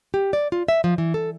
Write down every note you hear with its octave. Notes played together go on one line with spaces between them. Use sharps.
G4
D5
F4
E5
F3
E3
A4